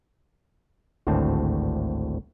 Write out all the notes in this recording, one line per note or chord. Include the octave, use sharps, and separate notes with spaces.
G#1 D2 A2 C4 A5